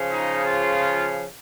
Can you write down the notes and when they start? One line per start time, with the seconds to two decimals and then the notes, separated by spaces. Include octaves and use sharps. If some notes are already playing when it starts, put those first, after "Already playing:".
Already playing: C#3 F3
0.12 D#4
0.45 F4